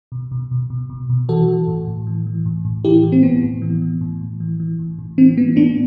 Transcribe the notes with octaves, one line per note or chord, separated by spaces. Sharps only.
B2
B2
B2
B2
B2
B2
E3 F#4 A4
E3
A2
A2
E3
E3
A2
A2
E3 E4 G4
E3
C4
A2 B3
A2
E3
E3
A2
A2
E3
E3
A2
A2
E3 C4
E3 B3
A2 B3 D4